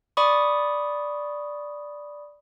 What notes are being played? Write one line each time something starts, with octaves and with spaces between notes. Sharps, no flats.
D5 B5 C#6 D#6